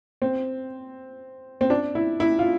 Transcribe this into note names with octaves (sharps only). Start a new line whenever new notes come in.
C4
C4
D4
E4
E4
F4